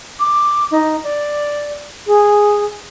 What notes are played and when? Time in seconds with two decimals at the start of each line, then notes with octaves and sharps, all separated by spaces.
0.19 D6
0.71 D#4
1.03 D5
2.06 G#4